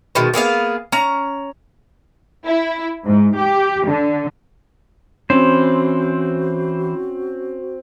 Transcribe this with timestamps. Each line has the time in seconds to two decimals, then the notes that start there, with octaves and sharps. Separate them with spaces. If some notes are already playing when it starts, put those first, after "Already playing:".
0.15 B2 D#3 G#3
0.34 A#3 B3 G#4 F5
0.92 C#4 A#5
2.45 E4
3.05 G#2
3.36 G4
3.87 D3
5.30 E3 C4 C#4 F#4 C5